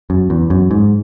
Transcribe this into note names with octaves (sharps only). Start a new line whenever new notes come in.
F#2
E2
F#2
G#2